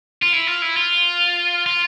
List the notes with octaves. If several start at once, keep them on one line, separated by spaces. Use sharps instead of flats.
F4
E4
F4
E4
F4
F4